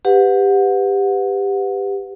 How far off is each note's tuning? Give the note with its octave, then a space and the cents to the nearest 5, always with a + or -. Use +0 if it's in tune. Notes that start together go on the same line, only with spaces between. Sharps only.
G4 +15 B4 +20 F#5 -25